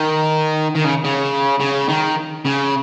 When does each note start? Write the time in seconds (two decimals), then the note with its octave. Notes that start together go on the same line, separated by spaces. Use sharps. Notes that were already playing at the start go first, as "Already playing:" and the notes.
Already playing: D#3
0.76 D#3
0.85 C#3
1.05 C#3
1.60 C#3
1.89 D#3
2.46 C#3